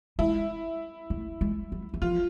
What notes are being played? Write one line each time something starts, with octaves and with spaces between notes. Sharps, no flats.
G#3 E4
A3
G#3
F#3
F#3
F3 F4